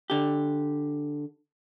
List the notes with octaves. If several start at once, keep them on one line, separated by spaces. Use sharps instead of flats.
D3 G4